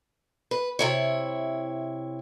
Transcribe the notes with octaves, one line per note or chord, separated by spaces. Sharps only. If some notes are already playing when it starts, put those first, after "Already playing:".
B4
C3 E4 C#5